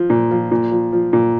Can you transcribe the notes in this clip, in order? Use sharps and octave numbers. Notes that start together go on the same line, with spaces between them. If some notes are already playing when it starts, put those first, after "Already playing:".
Already playing: F3
A#2
F3
A#2
F3
F3
A#2